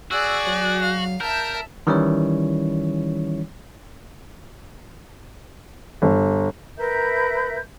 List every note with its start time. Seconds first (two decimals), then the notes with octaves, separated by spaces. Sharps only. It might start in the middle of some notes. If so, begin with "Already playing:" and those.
0.11 F#4 G#4 D5 E6
0.47 F#3
0.81 F5
1.21 A#4 E5 A5 G6
1.87 D#3 E3 G3 C#4 E4 C#5
6.02 G1
6.77 A#4 B4 E5 G6